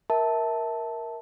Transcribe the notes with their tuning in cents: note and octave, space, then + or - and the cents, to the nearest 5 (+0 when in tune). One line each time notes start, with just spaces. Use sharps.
A#4 +10 E5 -25 A5 +0